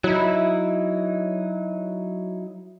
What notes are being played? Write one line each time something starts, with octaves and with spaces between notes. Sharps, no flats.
F#3 D#4 E4